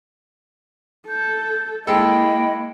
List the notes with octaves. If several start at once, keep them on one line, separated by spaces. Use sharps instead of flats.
A4 G6
G#3 A#3 E4 A4 D#5 G5 B5